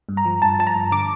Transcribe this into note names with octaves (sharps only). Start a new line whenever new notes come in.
G2
A#5
F3
G2 A5
F3 A5
A#5
G2
D3 D6